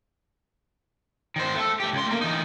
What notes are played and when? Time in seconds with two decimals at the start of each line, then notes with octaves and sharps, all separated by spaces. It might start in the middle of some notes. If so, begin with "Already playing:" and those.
1.36 D#3 C5
1.55 A3 A4
1.80 A3 G4
1.93 C#2 C6
2.06 A3 A#3
2.21 E3 D#4